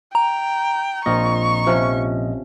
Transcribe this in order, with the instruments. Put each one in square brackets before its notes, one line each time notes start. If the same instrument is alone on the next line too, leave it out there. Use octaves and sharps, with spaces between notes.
[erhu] G5 [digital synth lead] A#5
[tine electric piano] A#1 A#2 D#5 [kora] C4 F4 [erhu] C#6
[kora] C3 F3 C#4